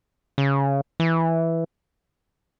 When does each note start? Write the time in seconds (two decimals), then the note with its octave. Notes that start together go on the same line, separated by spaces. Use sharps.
0.38 C#3
1.00 E3